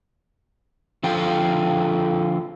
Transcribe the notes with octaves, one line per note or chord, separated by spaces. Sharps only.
D3 F3 F4 A4 G5